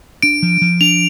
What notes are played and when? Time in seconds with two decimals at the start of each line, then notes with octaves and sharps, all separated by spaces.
0.22 D4 D7
0.43 F3
0.62 F3
0.81 D4 F7